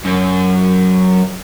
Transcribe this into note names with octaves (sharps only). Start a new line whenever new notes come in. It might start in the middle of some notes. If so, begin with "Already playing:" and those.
F#2